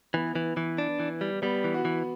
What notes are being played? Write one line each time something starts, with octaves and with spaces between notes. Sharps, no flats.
E3 B3
E3
E3
D4
E3
G3
G3 B3
E3
F#4
E3